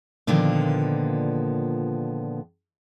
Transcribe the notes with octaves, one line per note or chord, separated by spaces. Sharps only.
A#2 D3 D#3 F3 A#3 B3